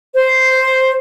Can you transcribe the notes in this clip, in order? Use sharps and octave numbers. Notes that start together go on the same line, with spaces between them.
C5